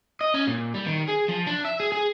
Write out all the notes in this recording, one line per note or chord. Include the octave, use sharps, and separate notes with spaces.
D#5
C#4
A#2
G3
D#3
G#4
F3
D4
E5
G#4
G#4